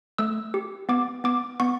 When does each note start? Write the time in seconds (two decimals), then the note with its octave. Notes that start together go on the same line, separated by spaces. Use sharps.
0.18 A3 E6
0.54 G4
0.89 B3 D6
1.24 B3 D6
1.60 B3 C#6